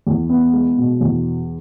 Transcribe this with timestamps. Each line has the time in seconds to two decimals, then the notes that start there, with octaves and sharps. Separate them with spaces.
0.07 E2
0.30 B3
0.53 G#3
0.77 B2
1.01 E2